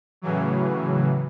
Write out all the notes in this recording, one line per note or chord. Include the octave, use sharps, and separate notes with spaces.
A2 C#3 E3 F#3